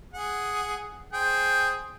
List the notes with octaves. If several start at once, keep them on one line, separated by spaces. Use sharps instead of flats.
G#4 F#5
G#4 C5 G5